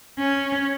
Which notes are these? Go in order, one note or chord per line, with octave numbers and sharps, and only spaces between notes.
C#4